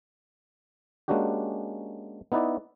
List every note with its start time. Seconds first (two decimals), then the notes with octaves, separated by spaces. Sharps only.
1.08 G#3 A#3 C#4 D4 F#4 G4
2.32 B3 D#4 E4 B4 D5